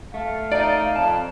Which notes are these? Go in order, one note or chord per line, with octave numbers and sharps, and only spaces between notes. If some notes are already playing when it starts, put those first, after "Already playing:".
A3 F5
D#4 D5
F2 A5